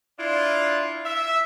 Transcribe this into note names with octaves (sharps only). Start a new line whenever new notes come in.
D4 E4 F4
E5